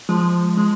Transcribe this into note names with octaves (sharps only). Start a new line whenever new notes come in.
F3 G#3
G#3